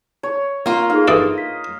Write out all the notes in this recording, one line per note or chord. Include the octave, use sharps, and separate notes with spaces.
C#5
A#3 F4
D#4 G#4 F5
E3 D4 A4 D#5
B6